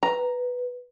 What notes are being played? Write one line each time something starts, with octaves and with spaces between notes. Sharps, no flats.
B4 A#5